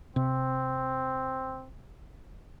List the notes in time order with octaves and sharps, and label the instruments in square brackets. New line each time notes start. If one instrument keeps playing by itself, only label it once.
[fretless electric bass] C3 [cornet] C4